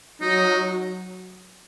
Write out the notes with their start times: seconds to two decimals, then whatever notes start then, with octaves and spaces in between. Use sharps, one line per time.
0.21 F#3 D#4